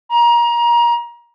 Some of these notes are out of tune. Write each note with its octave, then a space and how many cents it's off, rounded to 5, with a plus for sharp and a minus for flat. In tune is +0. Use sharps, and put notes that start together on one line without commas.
A#5 +25